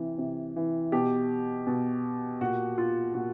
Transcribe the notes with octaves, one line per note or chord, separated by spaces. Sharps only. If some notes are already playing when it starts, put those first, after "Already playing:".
Already playing: C3 E3
C3
E3
B2 G4
B2
A#2 F#4
F4
A#2 F#4